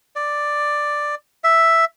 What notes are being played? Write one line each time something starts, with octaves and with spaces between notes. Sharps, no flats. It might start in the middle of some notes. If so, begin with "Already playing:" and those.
D5
E5